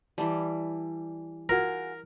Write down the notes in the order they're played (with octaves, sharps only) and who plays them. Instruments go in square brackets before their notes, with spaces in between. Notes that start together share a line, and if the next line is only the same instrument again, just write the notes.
[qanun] E3 G3 [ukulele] A5 B5
[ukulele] F4 F#4 G#4 [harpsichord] A#4